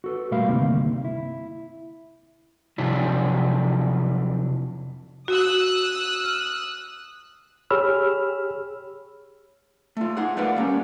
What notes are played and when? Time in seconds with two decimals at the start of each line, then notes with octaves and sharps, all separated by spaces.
0.04 F#4 A4 B4
0.31 A#2 G3 A3 A#4 F5 B5
0.48 D2 G2 C3 D#3 A#3
1.05 E4
2.78 C3 F3 F#3 D4 E4
5.28 F#4 D#6 E6 F#6
6.24 F6
7.70 G4 G#4 C#5 B5 E6 F6
9.97 A3 F4
10.17 D#4 G#4 F#5
10.37 A3 A#4 B4 D5 F5 F#5
10.56 G3 A#3 C#4